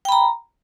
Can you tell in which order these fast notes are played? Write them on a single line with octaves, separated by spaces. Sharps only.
G5 B5 A#5